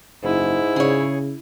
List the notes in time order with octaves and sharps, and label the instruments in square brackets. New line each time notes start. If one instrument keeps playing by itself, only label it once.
[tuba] F#1 [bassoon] G#2 [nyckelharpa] E4
[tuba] C#3 [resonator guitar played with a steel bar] G#4 C#5